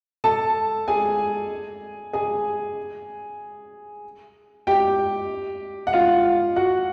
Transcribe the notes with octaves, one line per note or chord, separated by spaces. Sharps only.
A4 A5
G#4 G#5
G#4 G#5
G4 G5
F#5
F4 F5
F#4 F#5